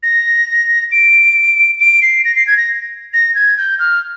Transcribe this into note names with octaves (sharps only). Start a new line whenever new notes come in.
A#6
D7
D7
C7
A#6
C7
G#6
A#6
A#6
G#6
G6
F6